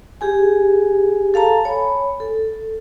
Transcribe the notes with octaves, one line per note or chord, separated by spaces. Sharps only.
G4 G#4 G#5
A4 F5 A5 A#5
C#5 G#5 B5
A4